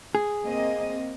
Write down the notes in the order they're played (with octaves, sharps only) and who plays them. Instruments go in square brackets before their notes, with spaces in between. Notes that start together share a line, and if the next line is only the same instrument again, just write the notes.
[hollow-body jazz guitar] G#4
[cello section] A#3 C4 D#5